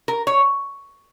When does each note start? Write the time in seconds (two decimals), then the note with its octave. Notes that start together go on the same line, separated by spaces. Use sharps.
0.08 A#4
0.27 C#5